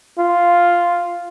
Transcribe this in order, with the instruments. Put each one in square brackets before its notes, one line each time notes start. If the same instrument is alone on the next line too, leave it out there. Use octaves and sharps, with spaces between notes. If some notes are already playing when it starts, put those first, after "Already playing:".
[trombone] F4